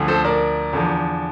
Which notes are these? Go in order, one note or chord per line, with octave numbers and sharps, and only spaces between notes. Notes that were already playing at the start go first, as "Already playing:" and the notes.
Already playing: D2 D3 F3
A4 C5
A#4 D5
E2 D3 F3